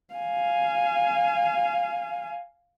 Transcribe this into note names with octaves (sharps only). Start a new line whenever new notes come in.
F5 G#5